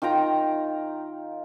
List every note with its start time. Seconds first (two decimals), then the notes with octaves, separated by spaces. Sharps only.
0.02 D#3 F4 G5 A#5